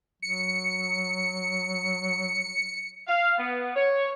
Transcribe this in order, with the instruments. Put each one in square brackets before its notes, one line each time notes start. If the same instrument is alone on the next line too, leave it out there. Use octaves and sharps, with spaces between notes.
[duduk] F#3 [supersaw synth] C#7
[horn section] F5
B3
C#5